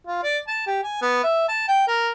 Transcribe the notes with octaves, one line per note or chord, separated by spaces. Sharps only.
F4
D5
A5
G4
G#5
B3
E5
A5
G5
A#4